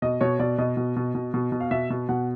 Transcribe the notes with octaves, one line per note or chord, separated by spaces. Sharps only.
B2 D#5
B2 C#5
B2 D5
B2 D#5
B2
B2
B2
B2
B2
F5
B2 E5
B2
B2 F#5